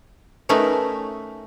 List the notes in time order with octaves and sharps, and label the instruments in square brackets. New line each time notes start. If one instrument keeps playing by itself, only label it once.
[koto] A3 C#4 D#4 A#4 B4 E5